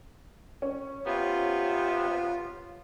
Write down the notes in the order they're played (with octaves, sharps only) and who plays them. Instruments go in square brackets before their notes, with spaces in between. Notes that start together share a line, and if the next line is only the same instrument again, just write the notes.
[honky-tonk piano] C#4
[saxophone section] C3 B3 [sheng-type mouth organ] F4